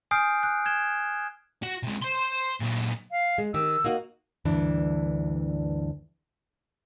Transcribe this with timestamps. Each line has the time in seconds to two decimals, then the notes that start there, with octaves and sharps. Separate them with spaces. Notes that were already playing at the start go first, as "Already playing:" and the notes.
0.11 G#5 D#6 F6 G6 C7 D7
0.43 F#6
0.66 G#6 E7 G7
1.63 F#4
1.83 C3 G#3
2.02 C5 C6
2.60 A#2 F#3
3.11 F5
3.38 G#3
3.54 D#3 G4 E6
3.84 A#3 D#4 F#4
4.45 D2 G2 E3 D4